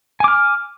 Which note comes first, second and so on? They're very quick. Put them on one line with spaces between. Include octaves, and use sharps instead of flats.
G#5 D6 F6